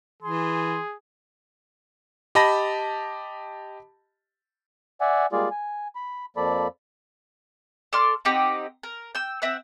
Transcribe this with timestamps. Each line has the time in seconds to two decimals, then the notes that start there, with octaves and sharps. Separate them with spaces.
0.23 E3 G#4 C6
2.35 G4 D#5 A5 B5 A#6
5.01 D5 E5 F#5 G#5
5.32 G3 G#3 A#3 F4 G#4 D5
5.51 G#5
5.95 B5
6.37 F2 F3 A#3 A4 D5 B5
7.93 A4 D5 C6 F6
8.25 C4 D#4 G4 F#5
8.83 A#4
9.15 G5 E6
9.42 C4 E5 F#5 E6